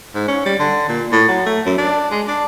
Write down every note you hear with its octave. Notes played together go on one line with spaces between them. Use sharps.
G#2
C#4
G3
D3
A#2
A2
F#3
A3
F#2
D4
G#3
D4